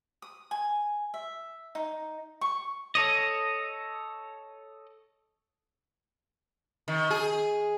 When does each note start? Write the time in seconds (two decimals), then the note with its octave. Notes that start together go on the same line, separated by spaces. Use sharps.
0.22 D#6
0.51 G#5
1.14 E5
1.75 D#4
2.41 C#6
2.95 A4 C#5 D#5
6.88 D#3
7.10 G#4